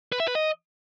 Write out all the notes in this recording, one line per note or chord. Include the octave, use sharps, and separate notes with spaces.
B4
E5
B4
D#5